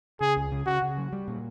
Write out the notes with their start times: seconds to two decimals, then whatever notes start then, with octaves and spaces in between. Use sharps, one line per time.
0.21 C#3 G#4
0.37 C#2
0.52 C#3
0.66 C#3 F#4
0.82 C#3
0.98 F#3
1.12 G3
1.28 A#2